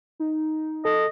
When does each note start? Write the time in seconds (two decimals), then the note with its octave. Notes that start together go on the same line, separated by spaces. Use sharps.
0.20 D#4
0.85 A4 D#5